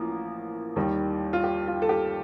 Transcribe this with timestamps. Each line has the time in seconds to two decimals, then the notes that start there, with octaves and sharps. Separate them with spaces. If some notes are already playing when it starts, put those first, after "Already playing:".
Already playing: A1 F3 A#3
0.76 D#2 D#3 G3
1.33 F4
1.44 G4
1.67 F4
1.82 A4
1.89 G4